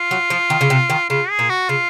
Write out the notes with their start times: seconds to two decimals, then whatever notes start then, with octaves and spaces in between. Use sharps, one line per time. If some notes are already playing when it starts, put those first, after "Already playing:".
Already playing: F4
0.11 F#3
0.30 F3
0.50 D#3
0.61 C#3
0.70 C3
0.90 D#3
1.09 C#3 F4
1.30 G#4
1.39 A#2
1.49 F#4
1.69 C#3 F4